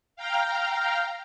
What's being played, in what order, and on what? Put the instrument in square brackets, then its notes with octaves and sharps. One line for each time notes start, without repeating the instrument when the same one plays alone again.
[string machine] F5 G5 A#5 F6